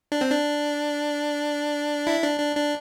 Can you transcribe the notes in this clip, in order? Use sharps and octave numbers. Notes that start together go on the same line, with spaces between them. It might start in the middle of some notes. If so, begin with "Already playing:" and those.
D4
C4
D4
E4
D4
D4
D4